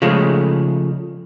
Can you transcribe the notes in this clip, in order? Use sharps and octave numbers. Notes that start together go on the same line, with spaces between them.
C#3 F3 G#3 A3